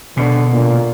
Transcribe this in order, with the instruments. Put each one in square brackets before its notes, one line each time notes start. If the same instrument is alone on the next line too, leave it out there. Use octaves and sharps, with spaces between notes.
[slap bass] B2 [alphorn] D3
[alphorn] A#2